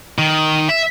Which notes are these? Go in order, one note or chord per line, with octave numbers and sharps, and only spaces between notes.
D#3
E5